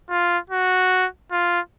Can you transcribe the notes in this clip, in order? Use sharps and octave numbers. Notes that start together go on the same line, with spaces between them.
F4
F#4
F4